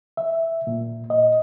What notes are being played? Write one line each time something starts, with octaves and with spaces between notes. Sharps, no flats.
E5
A#2
D#5